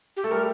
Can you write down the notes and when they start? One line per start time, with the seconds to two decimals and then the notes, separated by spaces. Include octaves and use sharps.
0.17 G4
0.24 A3 A4
0.31 G3 A#4